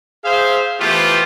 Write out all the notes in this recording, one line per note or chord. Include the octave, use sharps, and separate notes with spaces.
G#4 C5 E5 F5
E3 A3 B3 F4 G4 C5